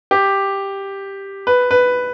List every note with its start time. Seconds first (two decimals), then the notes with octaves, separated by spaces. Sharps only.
0.11 G4
1.47 B4
1.71 B4